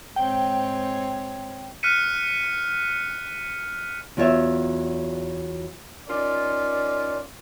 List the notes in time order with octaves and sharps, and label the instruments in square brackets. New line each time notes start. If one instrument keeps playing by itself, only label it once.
[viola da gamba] G#2 C4 C#5 [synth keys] G5
[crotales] F6 F#6 B6 C#7 D#7
[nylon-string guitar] E2 F#3 F4 G4 C#5 E5
[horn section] C#4 D#4 F4 A#4 D5